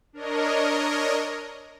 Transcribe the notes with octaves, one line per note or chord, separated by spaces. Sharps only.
D4 A#4 C#5 D#5